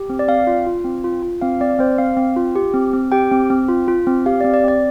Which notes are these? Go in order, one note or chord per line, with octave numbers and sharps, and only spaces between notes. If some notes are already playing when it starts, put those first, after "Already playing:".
Already playing: G4
C4
D5
C4 F5
F4
F4
C4
F4
F4
C4 F5
C4 D5
C4 C5
C4 F5
C4
F4
G4
C4
C4
G4 G5
C4
C4
F4
F4
C4
G4 F5
D5
C4
D5
C4 D5